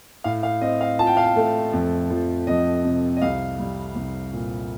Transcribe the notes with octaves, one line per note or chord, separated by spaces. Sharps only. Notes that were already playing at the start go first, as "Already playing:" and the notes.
A2 F5
F5
C4 D#5
F5
F4 A5
G5
F5
G5
A3
F2
F3
F2 D#5
C3
D#5
C2 F5
G3
C2
A#2